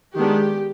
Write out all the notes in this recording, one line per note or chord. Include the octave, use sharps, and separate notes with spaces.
D#3 G#3 B3 D4 G4